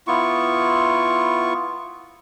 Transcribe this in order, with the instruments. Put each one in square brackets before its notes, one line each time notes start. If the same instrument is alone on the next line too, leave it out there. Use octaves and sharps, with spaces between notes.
[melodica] B3 E4 F4 C#6